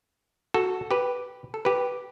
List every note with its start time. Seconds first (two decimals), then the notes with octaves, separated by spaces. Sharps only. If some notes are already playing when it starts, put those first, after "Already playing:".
0.54 F#4 A4
0.91 G4 B4
1.54 A4
1.65 G4 B4